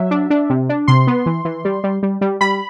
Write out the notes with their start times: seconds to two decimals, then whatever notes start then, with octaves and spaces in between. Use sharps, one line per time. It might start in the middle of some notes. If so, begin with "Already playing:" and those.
Already playing: F#3 E5
0.11 D4
0.30 D4
0.50 C3
0.69 D4
0.88 C3 C6
1.07 B3
1.26 E3
1.45 E3
1.65 G3
1.84 G3
2.03 G3
2.21 G3
2.41 G3 B5